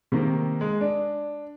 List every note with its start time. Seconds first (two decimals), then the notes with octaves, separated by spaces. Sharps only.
0.12 C3 D#3 A#3
0.61 G#3
0.81 D4